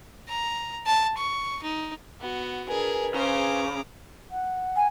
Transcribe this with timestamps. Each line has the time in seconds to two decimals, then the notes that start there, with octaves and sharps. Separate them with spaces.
0.28 A#5
0.87 A5
1.17 C#6
1.63 D#4
2.21 B3 F#4
2.69 D4 G#4 A#4 B4 G#5
3.14 C#3 C5 A#5 D6
4.30 F#5
4.76 G#5